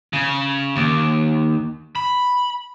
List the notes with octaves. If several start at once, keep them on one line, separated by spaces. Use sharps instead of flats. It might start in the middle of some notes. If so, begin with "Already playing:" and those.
C#3
D#2
B5